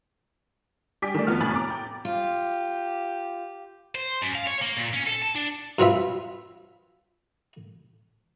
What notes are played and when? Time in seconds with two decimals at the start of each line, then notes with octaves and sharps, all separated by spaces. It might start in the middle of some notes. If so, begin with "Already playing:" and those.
1.02 G3 G5 G#5 D6 B6
1.14 D#3 A3 D5
1.27 F2 F3 B3 F6
1.41 A2 C3 G#5 B5 A6 F#7
1.55 A#5 D6
1.70 G5
2.05 F4 G4
3.95 C5
4.22 F#2
4.35 F5
4.47 C#5
4.62 A#3
4.77 A#2
4.94 C#4
5.07 A4
5.22 A5
5.35 D4
5.79 G2 F#3 C4 F4 B4 E5